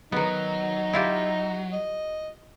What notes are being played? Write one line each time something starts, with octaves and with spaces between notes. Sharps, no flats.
D#3 F#3 B3 D#4
E4 F4 G4
D#5